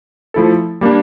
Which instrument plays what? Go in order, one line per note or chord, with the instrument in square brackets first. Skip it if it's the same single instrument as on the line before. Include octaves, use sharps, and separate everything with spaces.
[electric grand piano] F3 A3 E4 A4
G3 A#3 D4